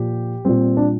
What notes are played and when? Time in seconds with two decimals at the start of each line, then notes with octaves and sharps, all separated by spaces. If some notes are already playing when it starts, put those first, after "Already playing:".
Already playing: A#2 F3 G4
0.45 A#2 G3 C4
0.77 D4